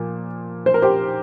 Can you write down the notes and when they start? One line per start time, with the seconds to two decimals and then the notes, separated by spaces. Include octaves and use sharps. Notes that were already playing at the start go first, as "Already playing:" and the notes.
Already playing: A#2 F3
0.66 C5
0.74 A#4
0.82 G4 C5